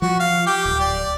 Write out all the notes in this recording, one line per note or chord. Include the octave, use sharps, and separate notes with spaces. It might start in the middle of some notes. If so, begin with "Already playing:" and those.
F3 F#4
F5
G4 G5 D6
D1
D5